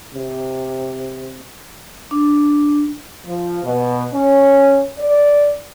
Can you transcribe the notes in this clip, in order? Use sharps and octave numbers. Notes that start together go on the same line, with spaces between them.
C3
D4
F3
B2
C#4
D5